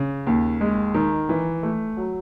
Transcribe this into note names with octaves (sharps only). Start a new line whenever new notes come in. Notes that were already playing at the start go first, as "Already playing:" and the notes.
Already playing: C#3
D#2
G#3
D#3
E3
A3
F#3